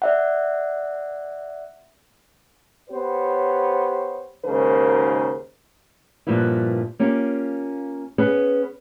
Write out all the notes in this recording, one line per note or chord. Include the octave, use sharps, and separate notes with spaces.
D5 E5 F#5
B3 G4 C5 C#5
D#2 G#2 C#3 A#4 C5
G2 A#2 F3 B3 E4
A#3 C#4 F4 G4
B3 C#4 G#4 B4